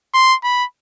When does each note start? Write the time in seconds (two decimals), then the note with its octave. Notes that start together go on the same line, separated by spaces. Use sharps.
0.14 C6
0.43 B5